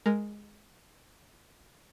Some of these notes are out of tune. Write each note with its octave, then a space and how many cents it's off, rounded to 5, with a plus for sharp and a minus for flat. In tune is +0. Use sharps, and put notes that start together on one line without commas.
G#3 +0 A#4 +0